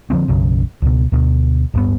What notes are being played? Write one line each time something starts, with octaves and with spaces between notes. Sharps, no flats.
D3 F3 G3 C4
B1 F#2 C#3
C#2 B2
D2 B2
D1 G2 B3